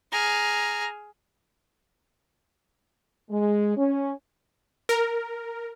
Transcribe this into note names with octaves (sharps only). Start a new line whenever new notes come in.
G#4 A#5 F6
G#3
C#4
A#4